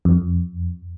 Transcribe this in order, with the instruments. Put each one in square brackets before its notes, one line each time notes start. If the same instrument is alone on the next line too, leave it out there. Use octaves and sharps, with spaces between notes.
[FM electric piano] F2